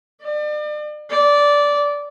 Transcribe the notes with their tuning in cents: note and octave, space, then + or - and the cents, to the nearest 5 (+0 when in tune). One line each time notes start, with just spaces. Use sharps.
D5 +40
D5 -15